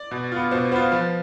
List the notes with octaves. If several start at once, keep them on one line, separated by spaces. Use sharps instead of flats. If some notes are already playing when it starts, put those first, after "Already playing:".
Already playing: D5
B2
B3 F4
B2 C5
B3 F4 C5
C5
F3 B4